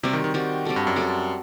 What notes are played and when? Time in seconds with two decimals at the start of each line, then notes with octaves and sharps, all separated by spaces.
0.03 C3 G3 C4 F#4
0.13 D#3
0.24 D#3
0.34 D#3 G3 C4 F#4
0.65 G3 C4 F#4 A4
0.76 G2
0.87 F#2
0.96 G3 C4 F#4 A4